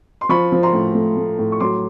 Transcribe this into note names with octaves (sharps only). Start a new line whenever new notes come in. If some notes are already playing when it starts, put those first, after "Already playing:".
C6
F3 B5 C#6
F3
A#5 C6
A2
A3
A3
A2
C#6
F#3 C6 D6